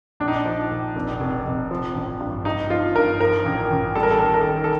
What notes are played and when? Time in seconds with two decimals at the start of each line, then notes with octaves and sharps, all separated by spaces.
0.20 A#1 D4
0.28 D#4
0.35 D4
0.45 F3
0.70 A#1
0.96 F1
1.20 F1
1.45 F1
1.71 F3
1.95 A1
2.20 G2
2.45 G2 D#4
2.70 F3 F4
2.95 G2 A#4
3.20 F3 A#4
3.45 A1
3.71 A1
3.95 G3 A4
4.03 A#4
4.11 A4
4.19 D#3 A#4
4.26 A4
4.34 A#4
4.41 D#3 A4
4.64 A4